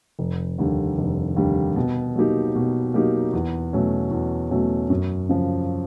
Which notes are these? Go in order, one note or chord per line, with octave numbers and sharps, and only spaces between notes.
F1
D#2 D3 G3
F1
D#2 D3 G3
B2
F#3 A#3 D#4 G4
B2
F#3 A#3 D#4 G4
E2
B2 F#3 A3 C#4
E2
B2 F#3 A3 C#4
F#2
C#3 F3